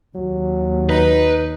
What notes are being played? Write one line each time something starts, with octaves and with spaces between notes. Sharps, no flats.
D#2 F#3
D#4 B4